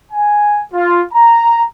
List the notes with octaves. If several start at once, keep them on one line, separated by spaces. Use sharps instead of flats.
G#5
F4
A#5